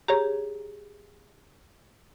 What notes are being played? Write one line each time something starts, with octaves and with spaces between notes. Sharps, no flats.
G4 G#4 C#5 A#5